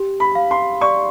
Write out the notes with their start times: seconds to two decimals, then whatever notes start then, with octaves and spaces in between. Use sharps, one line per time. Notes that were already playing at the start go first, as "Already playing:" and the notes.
Already playing: G4
0.20 B5
0.35 F5
0.51 C6
0.81 D5 C#6